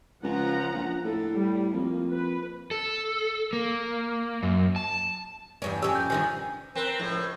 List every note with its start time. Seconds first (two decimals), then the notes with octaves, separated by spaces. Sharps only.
0.23 C#2 F3 F#5 A#5
0.74 A#1
1.04 A2 A4
1.35 G3
1.73 F2 A#3
2.11 B4
2.71 A4
3.53 A#3
4.43 F#2
4.76 A5
5.62 E2 G2 C#4
5.82 F2 C#4 G4 E6
5.96 G6
6.10 G2 D#3 F3 G#5
6.75 C4 A#4 B4
6.99 C#2 A2 F3